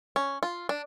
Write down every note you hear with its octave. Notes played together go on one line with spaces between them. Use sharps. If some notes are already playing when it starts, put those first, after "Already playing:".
C#4
F4
D4